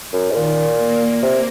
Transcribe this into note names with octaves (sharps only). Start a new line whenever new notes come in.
F#2
G#2
A#2 D#3
A#3
C3